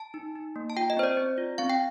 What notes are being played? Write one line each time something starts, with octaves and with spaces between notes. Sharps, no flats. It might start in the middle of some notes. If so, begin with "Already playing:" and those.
Already playing: A5
D#4
D#4
A#3
A5
F4 G5
D#5
C4 C5
D5
C4
F4
C4 F5
G5